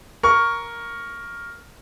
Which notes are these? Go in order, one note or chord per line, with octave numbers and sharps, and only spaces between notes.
A#4 C#6